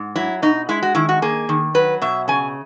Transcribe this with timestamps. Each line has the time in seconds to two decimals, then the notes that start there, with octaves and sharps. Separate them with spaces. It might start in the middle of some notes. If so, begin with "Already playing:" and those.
Already playing: G#2
0.16 F#3 E4
0.42 B2 D#4
0.69 G#3 E4
0.82 F#4
0.95 D#3 E4
1.09 F#4
1.22 A#3 G#4
1.49 D#3
1.74 F#3 B4
2.02 B2 E5
2.28 C#3 G#5